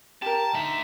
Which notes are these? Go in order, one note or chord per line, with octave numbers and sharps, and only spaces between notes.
G4 A#4 A5
D3 D#4 E5